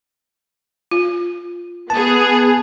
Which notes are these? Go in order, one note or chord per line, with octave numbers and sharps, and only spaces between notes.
F4
B3 G#4 A5